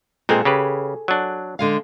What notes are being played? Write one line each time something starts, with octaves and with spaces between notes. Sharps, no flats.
A#2 G#3 C4 G#4 A4
C#3 G4 B4
F#3 D4
D3 G#3 F5